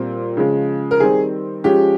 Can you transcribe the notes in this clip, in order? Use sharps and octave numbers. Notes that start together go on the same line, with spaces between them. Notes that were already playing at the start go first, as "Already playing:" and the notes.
Already playing: A#2 G3 C4
C#3 F3 G#3
A#4
D#3 G3 C4 G#4
F3 G#3 C#4 G4